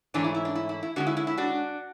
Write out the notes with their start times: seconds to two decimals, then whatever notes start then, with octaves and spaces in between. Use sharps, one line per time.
0.14 G#2 E3 A3 C#4 D4
0.24 E4
0.35 E4
0.45 D4
0.55 E4
0.69 E4
0.83 E4
0.96 D3 G#3 C#4 D4 F#4
1.07 E4
1.17 E4
1.27 E4
1.37 D4 F#4